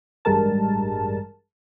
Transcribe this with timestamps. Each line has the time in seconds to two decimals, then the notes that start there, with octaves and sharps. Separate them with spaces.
0.25 A1 G2 G3 G#3 A#4 A5